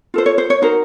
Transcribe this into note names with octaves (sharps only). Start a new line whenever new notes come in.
F4 A4 C5
C#5
C5
C#5
D#4 F#4 A#4 C5